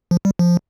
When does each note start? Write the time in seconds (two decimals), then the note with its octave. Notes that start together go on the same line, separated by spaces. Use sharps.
0.11 F3
0.25 G3
0.39 F3